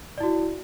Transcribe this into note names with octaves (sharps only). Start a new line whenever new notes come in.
E4 F#4 D5